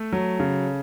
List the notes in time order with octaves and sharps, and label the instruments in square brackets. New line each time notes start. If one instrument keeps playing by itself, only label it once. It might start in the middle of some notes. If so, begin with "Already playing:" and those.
Already playing: [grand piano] A3 A4
F#3
C#3